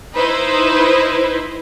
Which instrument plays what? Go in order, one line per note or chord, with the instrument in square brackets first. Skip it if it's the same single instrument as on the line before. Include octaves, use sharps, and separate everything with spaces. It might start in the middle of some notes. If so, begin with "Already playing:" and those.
[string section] D#4 E4 B4 C5